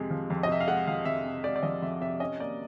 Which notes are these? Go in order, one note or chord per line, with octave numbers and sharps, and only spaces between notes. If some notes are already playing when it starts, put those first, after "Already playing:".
Already playing: F2 C3 G#3
F3
F2
D#5
C3 E5
F5
G#3 F#5
F3 F5
F2 E5
C3
G#3 D5
D5
F3 D#5
F2 E5
C3 E5
C#4 D#5
A#3 D5